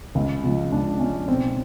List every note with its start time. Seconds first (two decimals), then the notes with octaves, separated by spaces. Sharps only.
0.15 C#2
0.43 C#3 F3 G#3
0.72 C#2 D4
0.99 C#3 F3 G#3 C#4
1.28 B1 C4